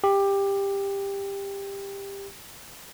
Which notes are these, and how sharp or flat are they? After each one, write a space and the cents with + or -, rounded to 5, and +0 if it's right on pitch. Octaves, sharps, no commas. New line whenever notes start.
G4 +15